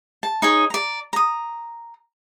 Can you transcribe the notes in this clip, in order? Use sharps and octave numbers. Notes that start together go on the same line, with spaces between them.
A5
D#4 G#4 C#5
D5 A#5
A#5 D#6